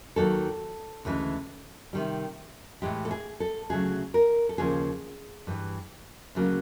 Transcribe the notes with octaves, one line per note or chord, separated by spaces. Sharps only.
D#2 D#3 F#3 A#3 A4
D2 C#3 E3 G#3
C3 D#3 G3
A2 E3 G#3 G4
A4
G#4
A4
D2 C#3 F#3 A3 G#4
A#4
A4
D#2 C#3 F3 A#3 G#4
G2 E3 G3
D2 C#3 F#3 A#3